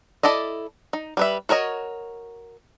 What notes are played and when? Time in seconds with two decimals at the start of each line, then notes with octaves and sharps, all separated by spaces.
0.23 E4 A4 D5 D#5
0.93 D#4
1.17 G3 B4 E5
1.49 F#4 A#4 C#5 D#5